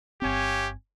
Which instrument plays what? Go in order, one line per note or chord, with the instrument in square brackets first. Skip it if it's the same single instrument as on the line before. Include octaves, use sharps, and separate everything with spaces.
[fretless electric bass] G1 C4 [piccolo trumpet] G4 [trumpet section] C#5 F5 G#5